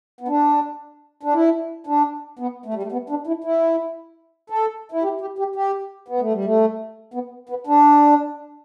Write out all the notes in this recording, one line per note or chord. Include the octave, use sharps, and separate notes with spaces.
B3
D4
D4
E4
D4
B3
A3
G3
A3
B3
D4
E4
E4
A4
E4
G4
G4
G4
G4
B3
A3
G3
A3
B3
B3
D4